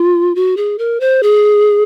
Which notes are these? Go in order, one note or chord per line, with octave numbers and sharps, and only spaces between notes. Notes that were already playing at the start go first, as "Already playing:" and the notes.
Already playing: F4
F#4
G#4
A#4
C5
G#4